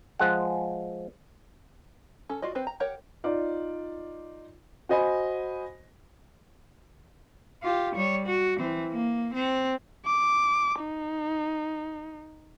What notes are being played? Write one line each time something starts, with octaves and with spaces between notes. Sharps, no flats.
F3 G#3 F#5
C#4 A4
F4 F#4 D5 D#5
C4 B4 C5
A#5
G4 A#4 C#5 F#5
D#4 F4 D5
F#4 C5 D#5 G#5 B5
F4 G4
G3 C#5
F#4
E3 C4
A#3
C4
D6
D#4